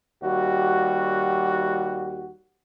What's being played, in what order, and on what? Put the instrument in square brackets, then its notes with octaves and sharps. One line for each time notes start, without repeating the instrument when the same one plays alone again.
[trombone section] D#2 G3 F#4